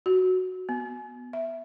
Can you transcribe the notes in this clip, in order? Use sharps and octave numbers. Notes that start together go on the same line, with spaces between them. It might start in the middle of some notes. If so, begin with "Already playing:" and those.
F#4
B3
E5